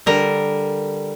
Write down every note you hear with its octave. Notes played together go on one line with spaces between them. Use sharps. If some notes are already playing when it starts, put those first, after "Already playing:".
D3 G3 A#4